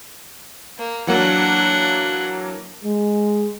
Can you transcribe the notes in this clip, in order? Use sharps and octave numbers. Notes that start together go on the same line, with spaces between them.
A#3
E3 F#3 A#3 D4 F#5
G#3